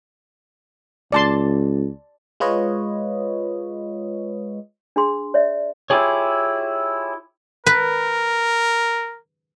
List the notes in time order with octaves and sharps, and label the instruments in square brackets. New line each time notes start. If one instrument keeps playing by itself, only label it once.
[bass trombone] C#2 [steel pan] D5 A5 C6
[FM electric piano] G#3 F4 B4 C#5 D#5
[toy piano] D4 G#4 C6
C#5 D5 E5
[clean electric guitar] E4 F4 G4 G#4 C#5
[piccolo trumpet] A#4 [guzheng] B4